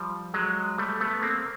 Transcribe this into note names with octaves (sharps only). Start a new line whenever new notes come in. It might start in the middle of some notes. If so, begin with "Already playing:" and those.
Already playing: F3 G3
F#3 G#3
G3 A3
A3 B3
A#3 C4